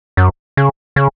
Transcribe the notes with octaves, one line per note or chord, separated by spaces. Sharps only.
F#2
C#3
C#3